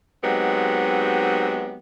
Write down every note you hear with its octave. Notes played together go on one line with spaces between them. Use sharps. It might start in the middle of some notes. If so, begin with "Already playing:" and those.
F#3 G#3 B3 C4 D#4 G4